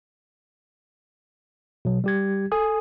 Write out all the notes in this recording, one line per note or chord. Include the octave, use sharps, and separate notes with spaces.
B2 F#3
G3 G4 G#6
A4 G#5 D#6